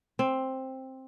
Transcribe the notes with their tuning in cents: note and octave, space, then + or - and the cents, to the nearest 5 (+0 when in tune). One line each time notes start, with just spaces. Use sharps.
C4 +10